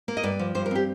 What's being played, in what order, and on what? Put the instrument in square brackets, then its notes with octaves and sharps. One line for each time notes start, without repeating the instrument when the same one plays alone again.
[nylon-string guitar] A#3
D#5
G2 D5
F3
G2 C5
A#4
C4 G4